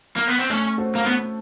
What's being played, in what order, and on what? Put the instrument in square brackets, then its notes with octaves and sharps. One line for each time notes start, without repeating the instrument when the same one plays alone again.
[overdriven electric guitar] A#3
B3
C4
[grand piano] A3 [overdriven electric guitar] C#4
[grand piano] C#4 F#4 A4 C5
[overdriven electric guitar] A#3
[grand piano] A3 [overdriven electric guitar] B3